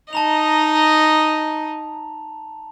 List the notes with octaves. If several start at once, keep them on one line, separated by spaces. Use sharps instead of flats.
D#4 D#5 A5 A#5 F7